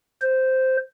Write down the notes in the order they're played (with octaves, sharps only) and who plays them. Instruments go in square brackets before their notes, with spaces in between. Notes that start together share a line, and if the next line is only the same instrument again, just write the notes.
[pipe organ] C5